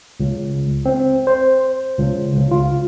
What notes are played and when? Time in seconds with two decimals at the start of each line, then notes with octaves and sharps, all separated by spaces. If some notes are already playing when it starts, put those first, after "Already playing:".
0.20 C#2
0.85 C4
1.27 C5
1.98 C#2
2.37 C#2
2.51 F4